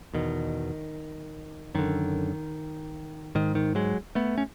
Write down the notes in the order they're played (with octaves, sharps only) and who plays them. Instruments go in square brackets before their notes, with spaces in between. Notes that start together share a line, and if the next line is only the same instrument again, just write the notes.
[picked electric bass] E2 B2 D#3
F#2 D3 D#3
G#2 D#3
D#3
F#3 G#3
A3 B3
C#4